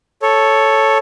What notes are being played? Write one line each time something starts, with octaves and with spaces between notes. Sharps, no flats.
A4 C#5